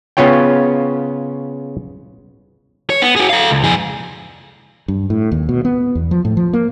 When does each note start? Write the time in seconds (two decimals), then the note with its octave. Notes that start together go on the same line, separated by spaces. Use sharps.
0.17 C#3 B3 C#4 F4 C#5 G5
2.90 C#5
3.02 B3
3.16 F#4 G#4
3.30 A4 F5
3.51 C#2
3.64 F2 G#4
4.88 G2
5.10 A2
5.32 D#2
5.49 B2
5.65 B3
5.95 E2
6.11 F3
6.25 A2
6.37 F3
6.53 A#3